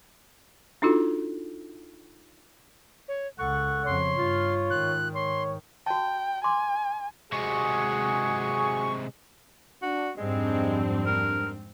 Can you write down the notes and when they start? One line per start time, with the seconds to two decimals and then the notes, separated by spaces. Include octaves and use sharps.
0.82 D4 D#4 F4 F#4 A4
3.08 C#5
3.39 C#2 A4 F#5 C#6
3.86 F2 C#3 C#5 C6
4.17 G2 F4
4.70 G#2 D#3 F#6
5.15 C#5 C6
5.86 F#4 G5 A5
6.44 G#5 C6 D6
7.32 C3 G#3 F#4 G#4 C#6
9.82 D4 F#4
10.17 F2 G#2 G3 G#3 C4 D4
11.06 A#4